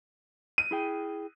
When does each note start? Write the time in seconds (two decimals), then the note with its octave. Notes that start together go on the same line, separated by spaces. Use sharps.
0.58 D#7
0.71 E4 G#4 G5